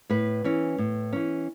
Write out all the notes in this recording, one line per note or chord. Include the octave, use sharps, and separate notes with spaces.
A2 B4
E3 C#4
A2
E3 C#4